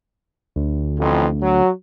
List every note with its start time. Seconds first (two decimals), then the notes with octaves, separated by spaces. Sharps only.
0.56 D2
0.99 A1 F2
1.43 F#3